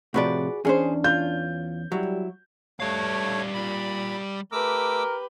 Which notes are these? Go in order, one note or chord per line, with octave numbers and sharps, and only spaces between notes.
A2 C3 F3 F#4 G#4 B4 D5
E2 C#4 D4 G#4 C5
F4 G6
F#3 G3 E4
G3 A3 C#5 F5
A#2 B5
A3 G4 A#4 B4 D6 E6